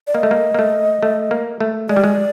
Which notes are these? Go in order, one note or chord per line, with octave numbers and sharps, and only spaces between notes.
D5
A#3 D#5
A3
A#3
A#3
A3
A3
A#3
A3
G#3 D5
G3
G#3